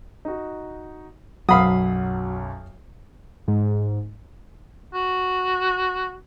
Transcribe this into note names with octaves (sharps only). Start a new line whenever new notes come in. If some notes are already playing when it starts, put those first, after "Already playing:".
D#4 F#4
B1 F#2 F#3 F5 B5 D#6 C7
G#2
F#4